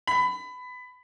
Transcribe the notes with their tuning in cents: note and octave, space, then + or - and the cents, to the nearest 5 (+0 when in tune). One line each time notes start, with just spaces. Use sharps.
B5 +20